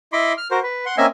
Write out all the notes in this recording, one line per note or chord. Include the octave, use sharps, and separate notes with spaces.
E4 D#5 B5 C6 D6
F6
F#4 A#4 C5
B4
F#5 C6
A#3 C4 C#4 D#5 E5 G#5